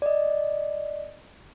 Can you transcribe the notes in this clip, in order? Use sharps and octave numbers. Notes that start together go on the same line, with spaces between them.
D5 D#5